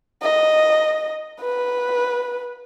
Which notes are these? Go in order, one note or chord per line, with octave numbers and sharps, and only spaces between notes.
D#5
B4